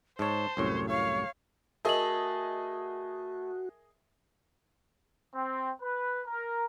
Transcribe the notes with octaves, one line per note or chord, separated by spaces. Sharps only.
G#2 C5 C#5 A5
C2 F#2 A2 C#5
C#5 F5
A3 F#4 G#4 A#4 D#5 F#7
C4
B4
A#4